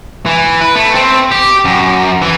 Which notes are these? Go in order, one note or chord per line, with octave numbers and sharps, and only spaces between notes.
E3
B4
A3
C4
G4
F#2
E3